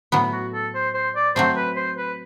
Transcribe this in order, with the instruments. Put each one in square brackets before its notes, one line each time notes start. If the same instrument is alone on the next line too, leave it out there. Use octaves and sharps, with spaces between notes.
[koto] A2 F#3 B3
[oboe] F#4
A4
C5
C5
D5
[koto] F#3 A3 C4 [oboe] C5
[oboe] B4
C5
B4